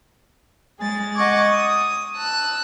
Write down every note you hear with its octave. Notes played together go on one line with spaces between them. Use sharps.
G#3 G#4 A6
D#5 F#5 C#6 D6 G#6 A6
D#6
A5 E6 F#6